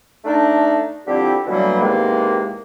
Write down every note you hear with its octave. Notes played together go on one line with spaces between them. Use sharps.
A3 D4 D#4
D3 F3 G3 C4 E4 G4
B2 D3 E3 F#3 G3 A#3
E2 C3 D#3 G#3 A#3